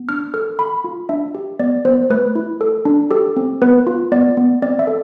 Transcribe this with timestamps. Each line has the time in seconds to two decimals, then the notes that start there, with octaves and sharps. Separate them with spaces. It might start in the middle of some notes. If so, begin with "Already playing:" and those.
Already playing: B3
0.09 D4 F6
0.34 A4 F6
0.59 A4 B5
0.84 F4
1.09 D4 E5
1.35 G4
1.59 B3 D5
1.85 B3 C5
2.10 A3 B4
2.35 E4
2.61 A4
2.85 D4
3.11 G4 A4
3.37 C4
3.62 B3 B4
3.87 F4
4.12 B3 D5
4.37 B3
4.62 C4 D5
4.79 E5
4.87 A4